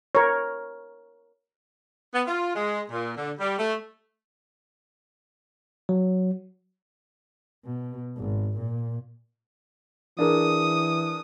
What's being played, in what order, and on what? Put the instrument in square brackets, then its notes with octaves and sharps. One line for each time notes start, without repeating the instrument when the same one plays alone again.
[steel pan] A#4 C#5
[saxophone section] B3
F4
G#3
A#2
D3
G3
A3
[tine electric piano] F#3
[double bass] B2
G#1
A#2
[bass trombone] E3 [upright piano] D4 G#4 A#4 [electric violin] D#6